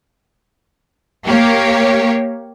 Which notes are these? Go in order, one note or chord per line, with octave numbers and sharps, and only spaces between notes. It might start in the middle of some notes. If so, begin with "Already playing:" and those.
A#3 G4 C#5